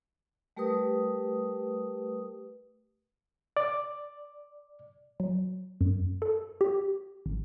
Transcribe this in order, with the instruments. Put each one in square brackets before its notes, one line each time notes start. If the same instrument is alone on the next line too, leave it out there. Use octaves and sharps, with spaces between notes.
[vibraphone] G3 A3 G4 A#4 B4 D#6
[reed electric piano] D5
[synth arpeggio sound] F#3
F#2
A4
G4
G#1